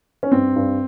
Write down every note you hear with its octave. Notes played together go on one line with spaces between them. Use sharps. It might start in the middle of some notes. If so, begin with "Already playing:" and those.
C#4
G2 C4
G2